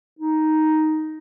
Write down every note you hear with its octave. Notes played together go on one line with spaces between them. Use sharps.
D#4